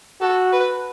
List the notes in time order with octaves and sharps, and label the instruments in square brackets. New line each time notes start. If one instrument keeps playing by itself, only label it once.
[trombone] F#4 [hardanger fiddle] A4
[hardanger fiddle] B4